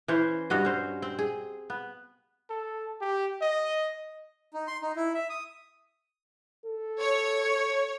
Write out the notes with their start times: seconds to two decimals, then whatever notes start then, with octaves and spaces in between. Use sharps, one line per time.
0.08 E3 C#4 C5
0.50 G2 F#4 D#5
0.65 C#4 C5
1.02 C4
1.19 G#4
1.70 B3
2.50 A4
3.01 G4
3.41 D#5
4.54 D#4
4.67 C6
4.82 D#4
4.96 E4
5.14 E5
5.30 D#6
6.66 A4
7.00 C#5